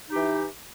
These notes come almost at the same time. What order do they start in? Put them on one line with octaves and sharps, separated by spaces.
D#4 G4 E3